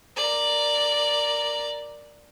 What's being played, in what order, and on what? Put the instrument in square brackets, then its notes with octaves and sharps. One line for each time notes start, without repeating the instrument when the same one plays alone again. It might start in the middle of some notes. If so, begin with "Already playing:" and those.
[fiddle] A#4 D5